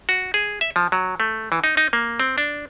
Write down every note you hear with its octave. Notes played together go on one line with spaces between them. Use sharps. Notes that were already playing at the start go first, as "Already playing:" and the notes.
F#4
G#4
E5
F3
F#3
A3
E3
D#4
D#4
A#3
C4
D4